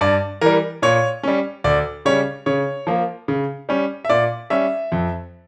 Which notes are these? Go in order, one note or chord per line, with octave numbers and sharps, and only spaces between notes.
G2 D5
E3 G3 A#4
A#2 C#5
G3 C#4
D2 D5
C#3 G3 C#4 C#5
C#3 C#5
F3 A#3
C#3
G3 C#4
E5
A#2 D5
G3 C#4 E5
F2